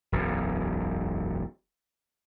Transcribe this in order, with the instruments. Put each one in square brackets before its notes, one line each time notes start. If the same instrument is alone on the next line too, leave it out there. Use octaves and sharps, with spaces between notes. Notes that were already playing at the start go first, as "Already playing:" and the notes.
[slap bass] E1 B1 F#2